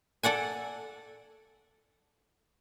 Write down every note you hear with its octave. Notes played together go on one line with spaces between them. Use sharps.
A4 D5 F#5 G#5